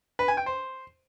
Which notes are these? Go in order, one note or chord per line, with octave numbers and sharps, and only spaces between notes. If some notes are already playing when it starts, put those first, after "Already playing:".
B4
G#5
G5
C5